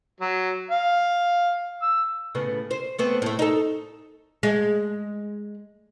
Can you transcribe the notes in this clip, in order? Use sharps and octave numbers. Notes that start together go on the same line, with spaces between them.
F#3
F5
E6
A2 C#3 B3
C5
A3 B3 C4
A2 A3
D#4 A4
G#3